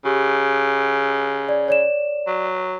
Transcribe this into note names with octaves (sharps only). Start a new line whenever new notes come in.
C#3 G4
D5
C#5 D5 E7
F#3